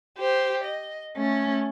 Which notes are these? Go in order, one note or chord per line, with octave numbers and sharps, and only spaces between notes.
G4 C5
D#5
A3 C#4